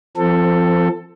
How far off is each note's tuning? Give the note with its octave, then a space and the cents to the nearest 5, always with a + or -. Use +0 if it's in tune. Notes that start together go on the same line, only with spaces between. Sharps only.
F3 -15 C4 +0 A4 +15